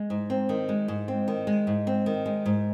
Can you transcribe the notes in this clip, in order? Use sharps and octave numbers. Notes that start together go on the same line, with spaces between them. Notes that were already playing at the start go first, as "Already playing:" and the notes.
Already playing: G#3
G#2
C4
D#3
G#3
G#2
C4
D#3
G#3
G#2
C4
D#3
G#3
G#2